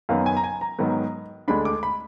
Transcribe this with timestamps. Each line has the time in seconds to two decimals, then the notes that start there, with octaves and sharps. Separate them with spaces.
0.09 F#2 D#3 F#3 B3 F5
0.26 G#5
0.37 A#5
0.44 G#5
0.61 A#5
0.79 G#2 D#3 F#3 B3
1.48 D2 D3 G#3 D4 B5
1.65 D6
1.83 B5